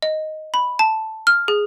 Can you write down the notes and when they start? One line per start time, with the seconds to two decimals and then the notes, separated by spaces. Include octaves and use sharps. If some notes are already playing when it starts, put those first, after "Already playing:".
0.02 D#5
0.54 B5
0.79 A5
1.27 F6
1.48 G#4